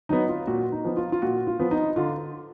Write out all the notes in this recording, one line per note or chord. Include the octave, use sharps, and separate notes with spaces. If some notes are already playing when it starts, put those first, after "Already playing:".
F#3 B3 D#4
F4
A#2 F#4
D#4
F3 B3
F4
F4
A#2 F#4
F4
F3 B3
D#4
D3 F4